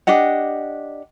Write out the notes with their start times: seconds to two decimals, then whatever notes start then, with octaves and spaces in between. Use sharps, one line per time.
0.07 D4 G4 D#5 F#5